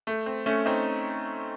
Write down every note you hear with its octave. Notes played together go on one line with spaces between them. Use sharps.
A3
C4
A3 C#4
C4 D#4